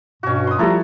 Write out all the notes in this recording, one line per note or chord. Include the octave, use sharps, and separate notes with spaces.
G2 B2 C#4 F#4
C6 D#6
F3 G3 E4 A4 A#5